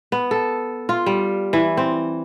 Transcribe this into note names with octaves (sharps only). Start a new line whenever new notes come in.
B3
A4
F4
G3
E3
C4